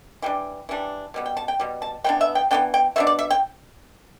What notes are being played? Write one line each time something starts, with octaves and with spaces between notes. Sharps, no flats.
E3 G3 D4 G5
E3 G3 D4
B2 G3 B3
G5
A5
G5
B2 G3
A5
E3 B3 D4 G5
E5
G5
E3 B3 D4 G5
G5
B2 B3 D4 E5
D5
E5
G5